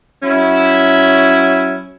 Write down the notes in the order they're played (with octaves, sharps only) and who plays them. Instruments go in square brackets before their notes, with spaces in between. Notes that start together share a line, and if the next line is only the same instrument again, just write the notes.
[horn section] F#3 C#4 E4